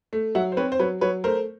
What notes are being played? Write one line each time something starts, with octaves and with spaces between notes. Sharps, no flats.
A3
F#3 E5 F#5
C5
C4 B4 C#5
C5
F#3 B4 C#5
F#3 B4 C#5
A3 A#4 C5